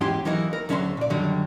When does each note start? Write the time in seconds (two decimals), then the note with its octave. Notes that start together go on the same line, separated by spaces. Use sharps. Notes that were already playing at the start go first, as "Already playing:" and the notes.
0.01 E2 G#2 C#4 E4 G4 C6
0.25 E3 F#3 A#3 D#4 E4
0.53 A#4
0.69 D2 F#3 C#4 E5 A#5 C6
0.97 A#2 D5
1.10 F#2 D3 D#3 F#3 G3